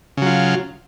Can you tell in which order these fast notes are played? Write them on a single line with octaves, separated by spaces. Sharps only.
C#3 F#3 F4